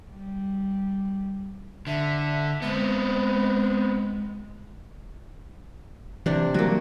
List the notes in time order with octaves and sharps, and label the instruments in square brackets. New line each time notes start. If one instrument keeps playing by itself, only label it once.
[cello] G3
[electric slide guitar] D3 [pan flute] E5
[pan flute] G#3 [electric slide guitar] B3 C4
[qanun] C3 D4 [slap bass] E3
[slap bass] E3 F#3 G3 [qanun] A#3 F#4